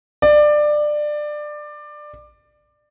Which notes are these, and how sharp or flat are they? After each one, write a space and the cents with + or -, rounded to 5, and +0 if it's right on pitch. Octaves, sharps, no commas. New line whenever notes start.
D5 +20